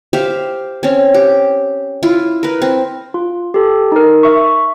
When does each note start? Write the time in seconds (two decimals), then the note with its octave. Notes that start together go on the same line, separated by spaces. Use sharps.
0.13 G4 C5 E5 F5
0.83 C4 C#4
1.14 G4
2.03 E4 F4
2.43 A#4 B4
2.62 C4
3.14 F4
3.54 G4 A4
3.92 D#4 A#4
4.23 E5 C#6